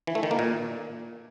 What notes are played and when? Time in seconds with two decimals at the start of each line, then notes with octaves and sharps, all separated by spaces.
0.07 E3
0.15 A3
0.23 D#3
0.31 A#3
0.39 A#2